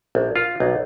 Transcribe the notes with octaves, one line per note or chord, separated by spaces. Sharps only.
A#1
F4
B1